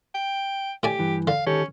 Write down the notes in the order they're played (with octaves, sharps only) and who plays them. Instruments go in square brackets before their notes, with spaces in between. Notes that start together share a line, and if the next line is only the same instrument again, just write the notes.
[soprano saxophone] G5
[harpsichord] A2 D5 G#5 [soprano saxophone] G4
[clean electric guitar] G2 E3
[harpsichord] D3 [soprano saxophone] F5
[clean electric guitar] D#3 G4 A4 [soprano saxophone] C#4